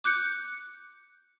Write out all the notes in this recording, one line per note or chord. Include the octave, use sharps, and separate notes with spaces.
D6 F#6 G6 C#7